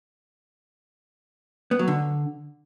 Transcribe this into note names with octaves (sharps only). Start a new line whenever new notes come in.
B3
F#3
D3